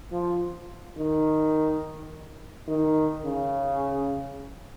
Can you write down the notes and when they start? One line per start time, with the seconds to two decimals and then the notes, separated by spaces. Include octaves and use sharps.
0.12 F3
0.97 D#3
2.68 D#3
3.25 C#3